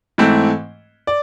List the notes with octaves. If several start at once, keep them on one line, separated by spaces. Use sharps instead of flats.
G#2 E3 A3 C4
D5